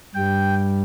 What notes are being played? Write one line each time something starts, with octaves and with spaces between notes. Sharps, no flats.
G2 G3 G5